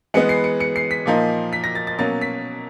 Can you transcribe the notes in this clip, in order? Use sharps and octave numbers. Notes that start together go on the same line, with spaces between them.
E3 G#3 B3 C#7
C7
C#7
C#7
C7
B6
A#2 F3 A#3 D#4
B6
A#6
A6
A6
B2 F#3 A#3 C#4 A6
B6